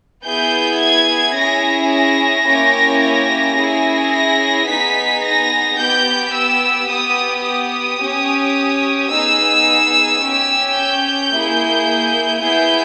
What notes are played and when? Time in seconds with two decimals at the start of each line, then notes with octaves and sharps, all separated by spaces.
0.24 B3 E4 G#4 G6
0.79 G#6
1.35 C#4 E4 G#4 A#6
1.91 A#6
2.46 A#3 C#4 E4 G4
3.01 A#6
3.56 C#4 E4 G#4
4.11 A#6
4.67 B3 D#4 G#4 B6
5.22 A#6
5.78 B3 G4 G6
6.33 E6
6.88 B3 G4 D#6
7.44 D#6
8.00 C#4 G4
9.10 B3 D#4 G#4 E6
10.21 C#4 G4
10.76 G6
11.32 A#3 E4 G#4
12.42 B3 E4 G#4 G6